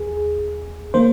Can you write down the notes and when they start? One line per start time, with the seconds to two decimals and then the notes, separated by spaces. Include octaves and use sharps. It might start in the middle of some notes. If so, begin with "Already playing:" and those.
Already playing: D#2 G#4
0.94 D#3 A#3 C5